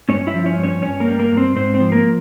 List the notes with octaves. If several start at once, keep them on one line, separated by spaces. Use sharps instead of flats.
G2 C#4 C#5
E4 E5
F3
C#4 C#5
G2
C#4 C#5
G2 C#4 C#5
A#3 A#4
G3
A#3 A#4
G2
C4 C5
G#2 C4 C5
C4 C5
F3
A#3 A#4